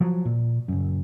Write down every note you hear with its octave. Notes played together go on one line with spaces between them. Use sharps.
F3 F#3
A#2
F#1 F#2